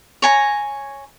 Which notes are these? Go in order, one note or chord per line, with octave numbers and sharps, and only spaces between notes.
C#5 G#5 A#5